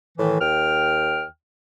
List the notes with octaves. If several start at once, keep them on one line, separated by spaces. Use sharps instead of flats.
A2 D#3 E3
D#2 G5 F6